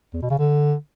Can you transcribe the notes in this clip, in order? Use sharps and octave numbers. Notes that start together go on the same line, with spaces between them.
E2
B2
C#3
D3